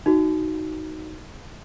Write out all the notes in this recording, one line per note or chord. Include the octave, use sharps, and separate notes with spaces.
D#4 F#4